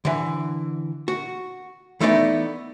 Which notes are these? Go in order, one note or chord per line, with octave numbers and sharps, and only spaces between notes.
D3 E3
F#4
E3 A3 B3 D#4 C5 D5